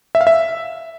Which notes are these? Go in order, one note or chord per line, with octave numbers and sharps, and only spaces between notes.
E5
F5
E5